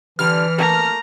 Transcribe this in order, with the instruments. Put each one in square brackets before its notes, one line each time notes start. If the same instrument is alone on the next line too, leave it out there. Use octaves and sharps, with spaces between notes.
[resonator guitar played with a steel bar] D3 G3 [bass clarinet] E3 [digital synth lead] F6
[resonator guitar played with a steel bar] A3 A#3 [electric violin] A#5